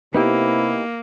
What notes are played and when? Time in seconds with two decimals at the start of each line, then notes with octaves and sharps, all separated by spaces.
0.14 C3 A#3 B3 D#4 E4 G4